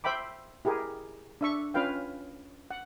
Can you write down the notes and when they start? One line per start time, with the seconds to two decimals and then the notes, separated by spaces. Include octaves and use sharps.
0.04 C5 E5 G5 B5 D6
0.65 E4 G4 G#4 A#4
1.41 D4 E5 C#6
1.74 C#4 F4 B4 F5 G5
2.71 F#5